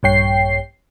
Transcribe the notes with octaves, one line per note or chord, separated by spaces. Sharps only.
A#1 G2 C#5 G5 C7